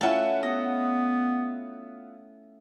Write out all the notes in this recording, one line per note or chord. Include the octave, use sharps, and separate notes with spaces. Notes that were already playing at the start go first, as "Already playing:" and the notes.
A3 C#4 E4 F4 E5 F#5 A5
B3 D#5